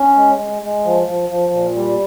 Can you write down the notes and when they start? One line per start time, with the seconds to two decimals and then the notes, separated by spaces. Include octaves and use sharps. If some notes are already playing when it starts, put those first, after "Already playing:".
Already playing: C#4
0.16 G#3
0.39 G#3
0.62 G#3
0.85 F3
1.07 F3
1.30 F3
1.53 A#2
1.76 G3